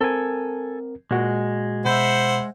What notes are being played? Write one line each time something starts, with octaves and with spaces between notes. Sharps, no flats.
C4 A4 A#4 G#5
A#2 G#3 F#4
B2 C5 E5 F#5 B5 G6